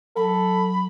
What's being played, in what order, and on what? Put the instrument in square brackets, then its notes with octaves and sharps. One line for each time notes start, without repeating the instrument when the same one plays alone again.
[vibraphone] F#3 [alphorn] A4 [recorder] B5